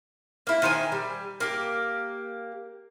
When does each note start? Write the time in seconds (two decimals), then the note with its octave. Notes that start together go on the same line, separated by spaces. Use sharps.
0.47 A#3 E4
0.62 D#3 C5 C#5 G#5
0.92 G3
1.40 A#3 G4